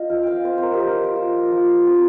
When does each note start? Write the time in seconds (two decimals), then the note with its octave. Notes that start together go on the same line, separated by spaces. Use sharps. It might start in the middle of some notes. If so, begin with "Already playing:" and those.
Already playing: F4 D#5
0.09 F3 F5
0.23 F5 G5
0.44 C4 C5
0.58 C5
0.63 A#4
0.74 G4
0.80 F3 A#4
1.04 C5
1.16 F4
1.52 F3
1.87 C4